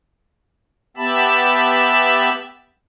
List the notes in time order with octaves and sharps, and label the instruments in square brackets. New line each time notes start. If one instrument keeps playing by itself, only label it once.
[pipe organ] B3 G4 E5 A5 B5